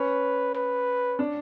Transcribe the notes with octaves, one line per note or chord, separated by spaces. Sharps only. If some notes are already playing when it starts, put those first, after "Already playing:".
Already playing: C#4 B4 C#5
B4
D4 D5